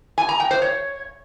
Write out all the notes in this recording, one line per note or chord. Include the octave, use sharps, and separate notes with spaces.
G#5
A#5
G5
C5
C#5